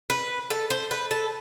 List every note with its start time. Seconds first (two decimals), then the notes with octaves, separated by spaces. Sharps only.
0.10 B4
0.50 A4
0.70 C5
0.91 B4
1.11 A4